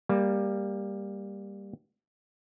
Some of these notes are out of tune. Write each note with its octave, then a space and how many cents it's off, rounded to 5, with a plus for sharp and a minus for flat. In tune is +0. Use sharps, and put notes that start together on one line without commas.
G3 +15 A#3 +0